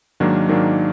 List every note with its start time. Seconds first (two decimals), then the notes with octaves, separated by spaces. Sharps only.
0.20 G#2 D#3 F#3 A#3 D4
0.49 G#2 D#3 F#3 A#3 D4